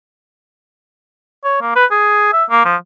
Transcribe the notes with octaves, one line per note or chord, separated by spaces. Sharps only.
C#5
A#3
B4
G#4
E5
A#3
F3